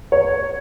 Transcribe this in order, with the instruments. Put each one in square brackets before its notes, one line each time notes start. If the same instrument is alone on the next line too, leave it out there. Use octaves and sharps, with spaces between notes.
[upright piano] C#5